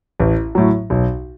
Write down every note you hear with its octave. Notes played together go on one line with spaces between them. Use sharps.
A1
A2 F#3
B1